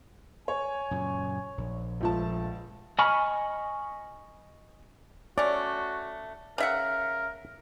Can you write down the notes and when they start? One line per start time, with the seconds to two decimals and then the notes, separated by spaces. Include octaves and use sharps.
0.48 C#5 G#5
0.91 F#2 A#2 C#3
1.58 A#1
2.01 C#2 F3 A3 A5
2.99 D#5 G#5 B5 C#6 F6
5.38 A3 C#4 F#4 D5
6.58 C#3 A#4 E5 F#5